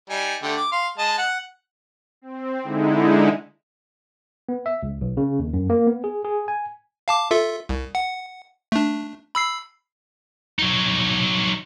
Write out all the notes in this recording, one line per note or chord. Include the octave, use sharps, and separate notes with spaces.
G3 D#4 G#5
D3 A3 G4
D6
F5 C6
G#3 D#5 A5
F#5
C4
D3 G#3 D#4 E4
B3
E5
C#2
B1
C#3
D#2
F#2
A#3
B3
G#4
G#4
G#5
F5 A5 D6
F4 A4 E5
C2
F#5
A3 D4
B5 E6 C7
F#3 D#4